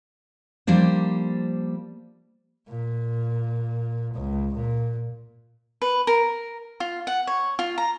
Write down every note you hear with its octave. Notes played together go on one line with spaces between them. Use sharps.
F3 G3 A#3 D4 C5
A#2
C#2
A#2
B4
A#4
F4
F#5
C#5
F4
A#5